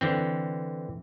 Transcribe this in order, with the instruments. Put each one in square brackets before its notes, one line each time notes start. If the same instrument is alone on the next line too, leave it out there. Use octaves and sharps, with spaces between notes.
[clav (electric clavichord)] D3 E3 C4